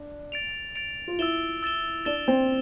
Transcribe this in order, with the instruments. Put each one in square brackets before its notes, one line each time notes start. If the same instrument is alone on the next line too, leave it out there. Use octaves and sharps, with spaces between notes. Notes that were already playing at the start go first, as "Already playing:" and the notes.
Already playing: [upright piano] D4
[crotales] A6 D7 F7
A6 D7 F7
[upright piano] F4
[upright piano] E4 [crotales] E6 A6 E7 G7
[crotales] E6 A6 E7 G7
[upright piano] D4 [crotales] A6 E7 G7
[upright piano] C4